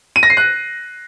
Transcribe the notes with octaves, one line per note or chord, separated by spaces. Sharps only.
D#7
A#6
C7
F#6